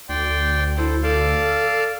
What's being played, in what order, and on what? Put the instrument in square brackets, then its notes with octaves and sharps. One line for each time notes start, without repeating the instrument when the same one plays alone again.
[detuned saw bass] D2 [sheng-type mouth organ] D5 G5 C6
[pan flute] E4 [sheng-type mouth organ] A4 C5
[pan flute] A4 [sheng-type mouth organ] D5 F5 A5